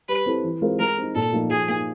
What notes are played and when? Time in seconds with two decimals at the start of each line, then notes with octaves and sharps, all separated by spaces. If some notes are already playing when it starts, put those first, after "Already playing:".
0.09 G3 B4
0.26 C4 E4 A4
0.44 E3
0.61 G#3 C4 F4 A#4
0.80 G#3 A#4
0.98 C4 D#4
1.15 A#2 A4
1.32 F3 A#3 D#4
1.50 F3 G#4
1.68 A#3 D#4